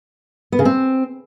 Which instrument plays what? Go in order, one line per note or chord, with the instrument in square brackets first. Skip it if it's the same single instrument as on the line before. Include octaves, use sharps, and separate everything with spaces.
[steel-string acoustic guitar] B3
C#3
C4